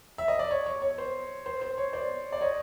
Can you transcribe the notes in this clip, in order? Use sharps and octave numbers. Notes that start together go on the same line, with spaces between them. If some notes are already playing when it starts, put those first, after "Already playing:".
E5
D#5
D5
C#5
C#5
C#5
C5
C5
C5
C#5
C5 D5
D5
C#5 D#5